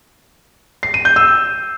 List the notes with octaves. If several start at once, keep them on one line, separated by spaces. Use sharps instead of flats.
C7
D#7
G6
E6